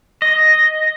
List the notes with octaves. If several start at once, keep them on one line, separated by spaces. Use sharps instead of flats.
D#5